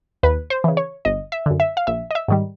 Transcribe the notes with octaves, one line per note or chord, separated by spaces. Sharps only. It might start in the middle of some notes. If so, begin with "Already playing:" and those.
D#2 B4
C5
C#3 E3
C#5
G1 D#5
E5
F#2 D3
E5
F5
A#1 E5
D#5
E5
G#2 D#3 G3